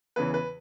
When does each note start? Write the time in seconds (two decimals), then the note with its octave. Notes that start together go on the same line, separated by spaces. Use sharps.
0.16 E2 C#3 E3 B4
0.34 B4